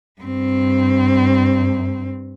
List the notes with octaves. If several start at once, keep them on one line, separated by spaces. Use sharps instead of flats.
G2 C4